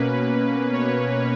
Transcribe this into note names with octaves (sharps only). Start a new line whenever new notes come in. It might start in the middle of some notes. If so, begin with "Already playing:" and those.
Already playing: B2 A#3 C#4 B4
C#5